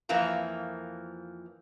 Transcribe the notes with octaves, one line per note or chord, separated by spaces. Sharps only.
F2 E3 F3 A#3 A#5